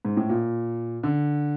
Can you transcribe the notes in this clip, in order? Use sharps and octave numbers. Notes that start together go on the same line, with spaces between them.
G#2
A2
A#2
D3